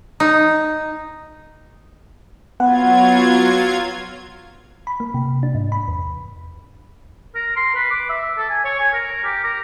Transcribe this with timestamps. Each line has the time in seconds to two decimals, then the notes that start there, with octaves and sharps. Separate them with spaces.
0.20 D#4
2.60 F#3 B3 F4 F#5 G#6
4.87 B5
5.00 A#3
5.14 C3
5.43 D4
5.55 G#2
5.72 B5
5.88 E2
7.35 A#4
7.56 C6
7.75 B4
7.90 D6
8.10 E5
8.37 A4
8.50 G#5
8.65 C#5
8.79 G#5
8.93 A#4
9.24 G4
9.44 A#4